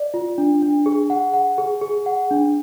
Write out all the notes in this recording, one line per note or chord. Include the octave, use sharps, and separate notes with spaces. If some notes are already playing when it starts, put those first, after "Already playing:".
Already playing: D5
F4
D4
D4
G#4
F#5
F#5
G#4
G#4
F#5
D4